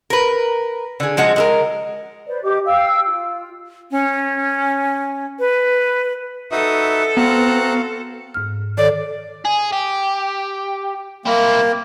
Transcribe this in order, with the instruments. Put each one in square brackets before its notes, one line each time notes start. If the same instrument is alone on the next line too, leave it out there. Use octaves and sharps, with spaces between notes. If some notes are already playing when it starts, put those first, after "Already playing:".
[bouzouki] A#4 B4
D3 G#4
F3 G#3 F#4
G#3 A4 A#4
[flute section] B4 C5 D5
G4 D#5 D6
F5 G5 E6
F4
[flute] C#4
B4
[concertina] D#4 F#4 B4 [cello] A4 [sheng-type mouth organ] E5 D#6
[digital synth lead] B3 [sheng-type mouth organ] C4 A#5 F#6 [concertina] F#4 F5
[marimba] G#2 F6
[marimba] D#3 A4 C#5 [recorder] D5
[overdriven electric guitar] G#4
G4
[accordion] A#3 [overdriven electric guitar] C4 E4